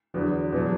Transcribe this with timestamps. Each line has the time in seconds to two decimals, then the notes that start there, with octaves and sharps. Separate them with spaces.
0.14 E2 D3 F#3 B3
0.52 E2 B2 F#3